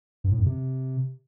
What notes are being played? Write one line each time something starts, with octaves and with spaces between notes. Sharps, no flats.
G2
A2
F#2
C3